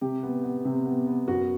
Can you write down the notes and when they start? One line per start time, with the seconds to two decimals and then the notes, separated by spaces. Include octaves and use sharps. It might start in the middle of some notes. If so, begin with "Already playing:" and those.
0.01 C3 G4
0.23 B3
0.44 B3
0.65 C3
0.86 B3
1.07 B3
1.28 F#2 F#4